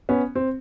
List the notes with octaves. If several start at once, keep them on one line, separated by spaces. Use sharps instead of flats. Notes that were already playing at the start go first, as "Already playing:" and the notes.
B3 C#4
C4